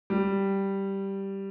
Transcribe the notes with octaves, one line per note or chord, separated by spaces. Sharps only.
G3